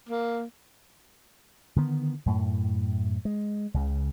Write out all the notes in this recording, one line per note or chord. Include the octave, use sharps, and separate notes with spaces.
A#3
D3 D#3 B3
F#2 A2
G#3
C#2 C#3